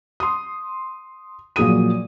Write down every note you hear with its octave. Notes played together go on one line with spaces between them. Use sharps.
C6 D#6
A#1 A#2 F#3 G#4 D#6 D#7